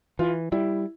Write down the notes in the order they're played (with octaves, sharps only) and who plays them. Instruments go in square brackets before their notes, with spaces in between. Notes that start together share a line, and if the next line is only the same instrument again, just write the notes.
[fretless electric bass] E3 [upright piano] F4
[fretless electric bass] G3 [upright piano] E4